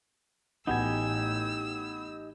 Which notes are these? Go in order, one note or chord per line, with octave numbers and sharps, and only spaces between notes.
A1 B3 D#4 F#4 G4 G#5 E6